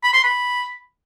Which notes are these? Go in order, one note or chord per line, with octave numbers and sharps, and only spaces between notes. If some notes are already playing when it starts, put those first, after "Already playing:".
B5
C6
B5